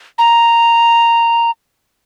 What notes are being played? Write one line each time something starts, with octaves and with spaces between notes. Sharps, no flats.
A#5